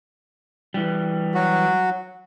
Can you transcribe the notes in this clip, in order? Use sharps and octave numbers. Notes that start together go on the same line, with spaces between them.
E3 G3
F#3 F#4